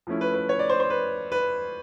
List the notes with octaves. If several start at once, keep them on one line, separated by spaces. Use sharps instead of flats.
F3 A3 C#4 E4
B4
B4
C#5
D5
C5
C5
B4
B4